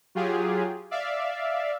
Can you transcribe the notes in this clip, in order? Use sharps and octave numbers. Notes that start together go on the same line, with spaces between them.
F#3 F4 G4 G#4
D5 E5 F5